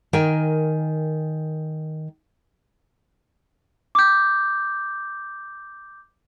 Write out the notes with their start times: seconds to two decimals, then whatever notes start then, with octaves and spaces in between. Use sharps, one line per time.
0.13 D#3 A#4 G5 G#5
3.95 D6 G6